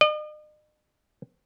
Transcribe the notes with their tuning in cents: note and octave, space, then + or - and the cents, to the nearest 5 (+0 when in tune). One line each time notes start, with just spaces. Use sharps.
D#5 -45